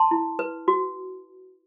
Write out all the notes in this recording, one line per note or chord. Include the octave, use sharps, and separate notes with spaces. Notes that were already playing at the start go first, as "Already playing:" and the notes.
Already playing: A5 C6
E4
B4
F#4